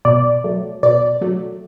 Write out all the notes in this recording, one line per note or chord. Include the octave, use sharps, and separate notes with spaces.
B2 D5
F#3 A3
B2 D5
F#3 A3